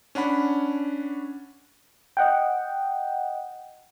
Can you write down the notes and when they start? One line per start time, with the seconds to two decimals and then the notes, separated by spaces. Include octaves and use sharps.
0.15 C#4 D4 F#5 B5
2.17 D#5 F#5 G5